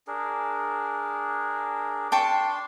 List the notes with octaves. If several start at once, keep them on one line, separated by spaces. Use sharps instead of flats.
D4 G#4 A#4
D4 G5 A5 C6 C#6